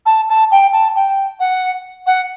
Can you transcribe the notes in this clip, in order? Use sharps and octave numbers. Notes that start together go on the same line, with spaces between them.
A5
A5
G5
A5
G5
F#5
F#5